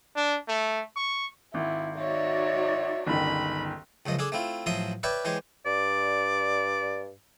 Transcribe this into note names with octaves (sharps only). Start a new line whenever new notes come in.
D4
A3
C#6
G#1 E4
D#4 F#4 C#5 D5 E5
G1 C#2 D#3 B5
C#2 F#2 F3 D#5
D4 G#4 A4 D5
A3 C4 E4 F4
A1 F3 F#3 E5 C6 D#6
B4 C#5 D5 E5 G5 A5
E3 G#3 G4 C5 C#5
G2 D5